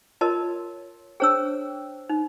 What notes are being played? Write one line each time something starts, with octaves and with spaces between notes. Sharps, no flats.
F4 A#4 C#5 D#5 A5
D4 G#4 C5 C#5 G5 E6
D#4